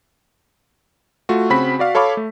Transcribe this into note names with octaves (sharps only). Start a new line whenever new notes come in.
A3 F4 F#4
C#3 C4 F#4 B5 B6
F#4 D5 F5
A4 C#5 F5 B5 D6
A3